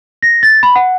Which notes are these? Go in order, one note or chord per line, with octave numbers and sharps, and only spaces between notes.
A#6
A6
B5
F#5